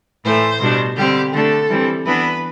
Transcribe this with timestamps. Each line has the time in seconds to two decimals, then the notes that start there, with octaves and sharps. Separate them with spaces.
0.24 A2 E3 A3 C5
0.60 B2 G3 D4
0.96 D3 G3 C4 G4
1.33 D3 A3 D4 A4
1.69 E3 G3 C4
2.06 E3 B3 D4 B4